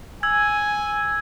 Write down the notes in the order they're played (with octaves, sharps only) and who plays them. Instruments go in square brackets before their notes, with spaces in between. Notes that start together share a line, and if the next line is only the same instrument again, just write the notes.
[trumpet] G#5 [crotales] E6 G#6